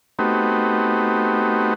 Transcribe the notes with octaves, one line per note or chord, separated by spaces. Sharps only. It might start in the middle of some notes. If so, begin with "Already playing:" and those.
A3 B3 C4 D#4 F#4 G4